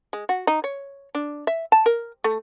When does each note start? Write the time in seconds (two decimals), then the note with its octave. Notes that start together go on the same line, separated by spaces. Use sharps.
0.13 G#3
0.29 F#4
0.47 D#4
0.64 C#5
1.15 D4
1.47 E5
1.72 A5
1.86 A#4
2.24 A3